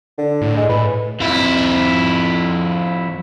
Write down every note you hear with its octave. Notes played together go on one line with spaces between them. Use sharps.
D3
A2
G#3
A2 B4
F2 E4